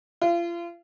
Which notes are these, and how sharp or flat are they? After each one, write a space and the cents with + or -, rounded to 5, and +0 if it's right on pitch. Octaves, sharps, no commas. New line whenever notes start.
F4 -35